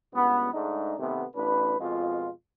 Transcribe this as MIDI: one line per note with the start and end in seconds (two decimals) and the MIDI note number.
0.13 0.51 37
0.13 0.51 43
0.13 0.51 59
0.53 0.94 44
0.53 0.94 56
0.53 0.94 57
0.53 0.94 62
0.53 0.94 63
0.99 1.24 48
0.99 1.24 51
0.99 1.24 57
0.99 1.24 59
1.36 1.79 33
1.36 1.79 62
1.36 1.79 71
1.79 2.29 41
1.79 2.29 47
1.79 2.29 56
1.79 2.29 65